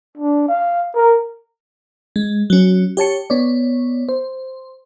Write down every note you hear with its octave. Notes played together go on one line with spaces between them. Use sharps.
D4
F5
A#4
G#3
F#3 C#4
G4 C#5 A5 C#7
B3 C#5 D5
C5